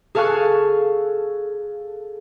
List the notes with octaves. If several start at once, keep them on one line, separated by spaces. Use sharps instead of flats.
G#4 A4 F5 G#5 C#6 F#6